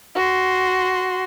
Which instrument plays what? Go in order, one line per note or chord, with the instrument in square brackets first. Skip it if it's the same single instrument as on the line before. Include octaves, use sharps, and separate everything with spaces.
[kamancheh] F#4 C6